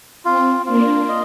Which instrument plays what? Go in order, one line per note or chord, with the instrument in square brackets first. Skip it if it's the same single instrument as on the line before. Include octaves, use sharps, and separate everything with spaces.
[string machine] C4 [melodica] F4
[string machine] A#3 D4 [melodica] F4
[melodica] D#5